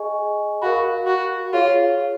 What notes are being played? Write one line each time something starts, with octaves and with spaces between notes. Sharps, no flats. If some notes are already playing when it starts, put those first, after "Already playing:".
Already playing: G#4 D#5 G#5 C#6
F#4 A#4 F5 B5
F#4
F4 G#4 C#5 F5